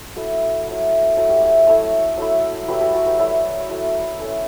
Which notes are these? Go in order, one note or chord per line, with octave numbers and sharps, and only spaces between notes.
F#3 A3 E4 F#4 A4
F#3 A3 E4
F#3 A3 E4 F#4 A4
G4
C#5 E5
F#3 A3 E4 A4 C#5
F#3 A3 E4
F#3 A3 E4 G4 B4
F#4 A4
F#4 A4
G4 B4
F#3 A3 E4 B4 D5
F#3 A3 E4
A3 C#4 E4 A4 C#5